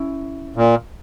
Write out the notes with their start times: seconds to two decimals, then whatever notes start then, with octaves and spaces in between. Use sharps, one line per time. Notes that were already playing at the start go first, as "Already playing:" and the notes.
Already playing: C#4 E4
0.56 A#2